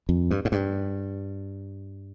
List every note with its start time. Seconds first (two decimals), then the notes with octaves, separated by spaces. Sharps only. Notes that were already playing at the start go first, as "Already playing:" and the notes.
0.09 F2
0.31 G2
0.45 G#2
0.52 G2